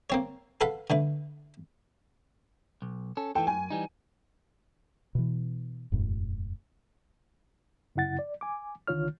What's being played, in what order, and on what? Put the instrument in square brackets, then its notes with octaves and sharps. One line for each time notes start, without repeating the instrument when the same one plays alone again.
[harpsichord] A#3 C4 C#5
A4 B4 F5 F#5 B5
D3 A3 B4
[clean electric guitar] B1
C#4 A4
[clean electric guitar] E3 A4 [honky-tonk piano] G5
[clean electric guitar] F#2 [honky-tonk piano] G#5
[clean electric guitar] E3 G3 D#4
[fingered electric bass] B2 E3
E1 F#2 A2
[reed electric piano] F#2 C#3 E4 F#5 A6
D5
G#5 D6
C2 D3 D#3 F4 C#5 F6